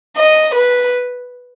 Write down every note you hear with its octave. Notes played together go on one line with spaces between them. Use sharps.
D#5
B4